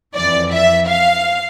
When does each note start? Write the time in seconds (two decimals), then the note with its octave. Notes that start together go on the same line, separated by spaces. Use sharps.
0.15 F2 E3 D5
0.53 E5
0.89 F5